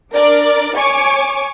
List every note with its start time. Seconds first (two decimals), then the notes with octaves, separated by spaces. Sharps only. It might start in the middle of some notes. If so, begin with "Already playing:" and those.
0.13 D4 A#4 D5
0.76 C#5 G#5 C#6 D6